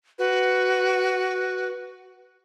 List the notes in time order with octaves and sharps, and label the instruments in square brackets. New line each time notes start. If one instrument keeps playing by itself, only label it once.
[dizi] F#4 [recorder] B4